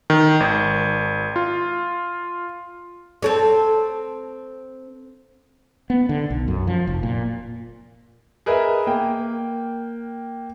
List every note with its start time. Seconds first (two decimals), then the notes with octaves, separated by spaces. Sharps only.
0.10 D#3
0.40 G#1
1.36 F4
3.22 C4 A4 C#5
5.90 B3
6.09 D3
6.30 B1
6.48 F#2
6.67 F3
6.87 F1
7.03 A#2
8.46 G#4 A#4 B4 D#5 E5
8.87 A#3 G5